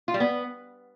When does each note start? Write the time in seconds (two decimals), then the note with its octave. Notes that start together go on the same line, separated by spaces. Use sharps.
0.08 F4
0.14 G3
0.20 B3